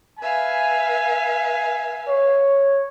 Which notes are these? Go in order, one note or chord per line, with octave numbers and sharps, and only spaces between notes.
B4 E5 F5 G#5
C#5